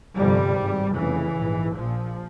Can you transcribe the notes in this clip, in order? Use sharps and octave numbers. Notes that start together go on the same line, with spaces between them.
G1 F2 C3 G3
G#1 G2
F1 E2 C#3 E3
A#1 G#2
A#1 A#2 F3